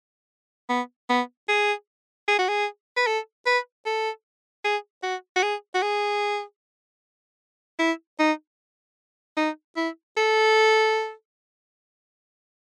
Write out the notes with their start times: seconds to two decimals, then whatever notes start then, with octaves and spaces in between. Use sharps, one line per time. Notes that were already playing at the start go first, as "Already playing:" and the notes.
0.69 B3
1.10 B3
1.49 G#4
2.28 G#4
2.39 F#4
2.49 G#4
2.97 B4
3.07 A4
3.46 B4
3.86 A4
4.65 G#4
5.03 F#4
5.36 F#4
5.43 G#4
5.75 F#4
5.83 G#4
7.79 E4
8.19 D#4
9.37 D#4
9.77 E4
10.17 A4